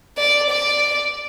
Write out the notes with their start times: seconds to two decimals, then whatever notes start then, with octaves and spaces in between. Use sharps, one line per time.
0.18 D5
0.50 D5